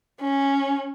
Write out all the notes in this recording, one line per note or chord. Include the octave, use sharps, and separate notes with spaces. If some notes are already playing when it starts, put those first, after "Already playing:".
C#4